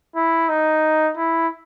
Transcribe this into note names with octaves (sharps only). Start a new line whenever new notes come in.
E4
D#4
E4